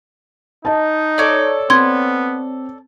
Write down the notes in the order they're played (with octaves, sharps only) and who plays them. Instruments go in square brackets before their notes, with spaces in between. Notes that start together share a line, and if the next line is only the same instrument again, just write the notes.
[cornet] D#4 [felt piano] D#5 A5
[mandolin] A4 C#5 D5
[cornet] B3 [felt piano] C4 [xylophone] C6 G#6